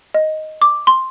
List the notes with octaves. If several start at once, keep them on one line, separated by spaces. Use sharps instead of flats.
D#5
D6
C6